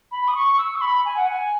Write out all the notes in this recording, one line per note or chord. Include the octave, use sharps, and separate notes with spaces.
B5
D#6
C#6
E6
C#6
B5
G#5
F#5
G#5